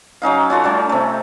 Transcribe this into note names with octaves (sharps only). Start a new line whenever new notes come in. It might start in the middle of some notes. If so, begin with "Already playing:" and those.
F#3 C#4 D#4 F5
C#4 F4 F#4 A4
G3 A3 C#4
C3 A3